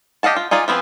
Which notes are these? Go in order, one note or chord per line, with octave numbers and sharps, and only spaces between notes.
G4 D#5 F5 F#5 A5
F4
D#4 F4 G#4 D5
F3 B3 C4 F#4 G#4